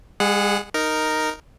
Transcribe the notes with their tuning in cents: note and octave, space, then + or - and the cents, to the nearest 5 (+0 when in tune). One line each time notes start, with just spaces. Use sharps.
G#3 -45 G#4 +10 F#5 -15
D#4 +0 A#4 +0